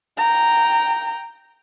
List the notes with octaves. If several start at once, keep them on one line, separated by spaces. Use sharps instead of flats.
G5 A#5